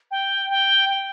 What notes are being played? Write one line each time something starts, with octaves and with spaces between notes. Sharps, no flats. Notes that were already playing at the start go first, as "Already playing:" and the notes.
G5
G5
G5